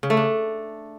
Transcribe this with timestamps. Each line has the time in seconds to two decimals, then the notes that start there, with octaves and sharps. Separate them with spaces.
0.03 C#3
0.10 A3
0.17 D4